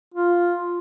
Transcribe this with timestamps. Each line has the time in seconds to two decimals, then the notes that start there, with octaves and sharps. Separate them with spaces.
0.14 F4